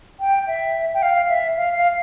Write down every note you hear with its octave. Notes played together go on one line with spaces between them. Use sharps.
G5
E5
G5
F5
E5
F5
F5